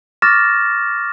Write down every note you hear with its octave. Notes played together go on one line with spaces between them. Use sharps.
C#6 D6 F6 A6 A#6 E7